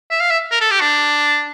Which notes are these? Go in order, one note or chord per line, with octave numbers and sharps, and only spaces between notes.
E5
F5
E5
A#4
A4
G4
D4